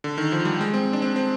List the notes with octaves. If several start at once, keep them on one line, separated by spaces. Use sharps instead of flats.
D3
D#3
F3
G3
G#3
C4
D4
C4
C4